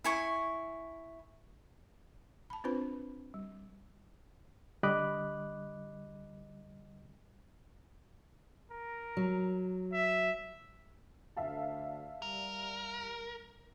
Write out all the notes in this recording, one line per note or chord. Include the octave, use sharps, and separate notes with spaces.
E4 G#5 C#6
A5 B5
C4 D4 F4 B4 C5 B5
G3
D3 G3 D#5 B5 D6 F#6
A#4
F#3
E5
D2 D3 E5 F5 A5
G3 A#4